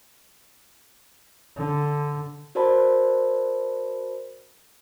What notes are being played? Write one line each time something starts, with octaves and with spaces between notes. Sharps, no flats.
D3
F#4 A#4 C5 D5 A5 B5